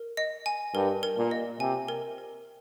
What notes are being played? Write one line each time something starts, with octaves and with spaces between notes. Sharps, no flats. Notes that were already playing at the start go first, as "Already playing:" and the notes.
Already playing: A#4
D#5
G#5
G2 A#4
A#4
A#2
D#5
C3 G#5
A#4
A#4